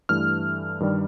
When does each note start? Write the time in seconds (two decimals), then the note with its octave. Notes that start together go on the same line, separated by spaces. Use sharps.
0.09 G2 E3 A3 F6
0.80 G2 D#3 G3